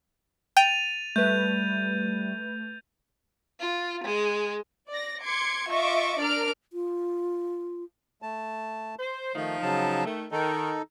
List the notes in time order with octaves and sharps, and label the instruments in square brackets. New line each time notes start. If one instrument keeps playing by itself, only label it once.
[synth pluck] G5 [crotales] A6 D#7 F7
[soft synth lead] G3 [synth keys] A3 B4 [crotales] G6
[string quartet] F4
G#3
[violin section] D5 A#6
C6 D6 G#6 C#7
F4 D#5 E5 C#6 D6
D4 A#4 D5 F6 D7
[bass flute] F4
[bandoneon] A3 A5
[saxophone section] C5
[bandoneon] D#3 A3 [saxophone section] F3 D#4
[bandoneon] C#3 F#3 A5
[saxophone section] D#3 A3
[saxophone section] D#3 [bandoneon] D#4 A4